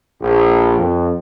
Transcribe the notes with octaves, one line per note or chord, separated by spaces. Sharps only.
A#1
F2